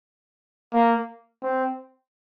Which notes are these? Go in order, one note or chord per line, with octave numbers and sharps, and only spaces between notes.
A#3
C4